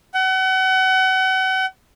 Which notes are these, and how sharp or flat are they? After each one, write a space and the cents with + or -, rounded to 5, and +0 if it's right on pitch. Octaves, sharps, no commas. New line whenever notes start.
F#5 +35